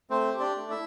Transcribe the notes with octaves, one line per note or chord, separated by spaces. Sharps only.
A3 C4 C5
G4
D4 D5
A3
E4 E5